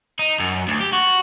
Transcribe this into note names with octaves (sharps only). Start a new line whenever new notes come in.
D#4
F#2
D2
G4
F#4